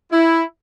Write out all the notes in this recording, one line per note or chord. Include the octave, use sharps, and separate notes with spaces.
E4